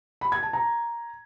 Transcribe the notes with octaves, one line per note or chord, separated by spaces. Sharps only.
B5
G#6
A5
A#5